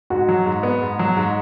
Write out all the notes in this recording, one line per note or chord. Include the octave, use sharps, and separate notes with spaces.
G#2 F#4
F#3
G#2
B3
G#2
F#3
G#2